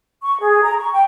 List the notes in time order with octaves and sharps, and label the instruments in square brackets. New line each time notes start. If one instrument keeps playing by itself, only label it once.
[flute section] C#6
G#4
A#5
C#6
G5